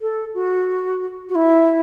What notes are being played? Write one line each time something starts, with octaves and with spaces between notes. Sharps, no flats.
A4
F#4
F#4
E4